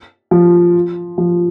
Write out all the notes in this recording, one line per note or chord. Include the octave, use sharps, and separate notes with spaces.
F3
F3